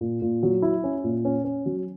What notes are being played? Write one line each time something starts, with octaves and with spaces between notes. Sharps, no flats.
A#2
A#2
F#3
E4
C#4
A#2
C#4
C#4
F#3